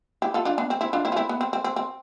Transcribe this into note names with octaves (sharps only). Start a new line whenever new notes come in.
E4 G4
F4 A4
D4 F4
B3 D4
C4
C4 E4
D4 F4
C4 E4
F4
C4 E4
B3
C4
C4
C4
C4